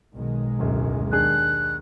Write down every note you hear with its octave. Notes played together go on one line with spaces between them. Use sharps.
B1 D#3 G#3
D1 F#2
D#2 D4 G#4 F#6